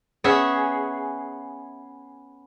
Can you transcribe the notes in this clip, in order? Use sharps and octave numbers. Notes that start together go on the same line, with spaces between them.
B3 C#4 G#4 E5